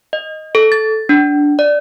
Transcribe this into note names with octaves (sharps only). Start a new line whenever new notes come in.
D#5
A4
A6
D4
D5